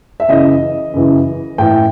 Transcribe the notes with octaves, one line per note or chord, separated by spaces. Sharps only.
E5
F#2 C#3 E3 D#5
F#2 C#3 E3
A2 E3 G5